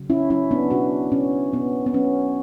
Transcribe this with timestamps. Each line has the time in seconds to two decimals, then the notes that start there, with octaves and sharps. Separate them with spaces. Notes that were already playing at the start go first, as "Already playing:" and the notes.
Already playing: C#3 F#3
0.10 C#4 E4
0.30 F#3 C#4 E4
0.51 B3 D4
0.71 B2 D4 F#4
1.12 B2 C#4
1.53 B2 B3
1.86 B3
1.93 F#3 C#4